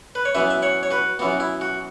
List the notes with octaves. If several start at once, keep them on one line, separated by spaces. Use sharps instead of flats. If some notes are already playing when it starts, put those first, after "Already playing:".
B4
C#5
F#2 E3 B3 B4 E5
E5
C#5 F#5
C#5
F#4 B4
F#2 E3 B3 F#4
E4
F#4